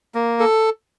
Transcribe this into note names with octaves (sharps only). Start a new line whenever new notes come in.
A#3
A4